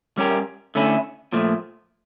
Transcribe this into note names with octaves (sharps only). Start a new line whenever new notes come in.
G3 C#4 G4 A#4
D3 A3 C#4 E4
A#2 F3 A3